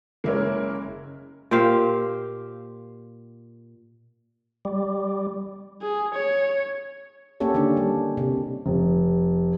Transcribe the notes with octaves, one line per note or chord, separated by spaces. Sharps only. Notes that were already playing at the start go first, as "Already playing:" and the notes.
F#1 G#3 A#3 E4 A#4 C#5
A#2 G4 C5 F5
G3
G#4
C#5
A#3 C#4 G4 A4 C#5
D3 D#3 C#4 D4
G3
C3
F1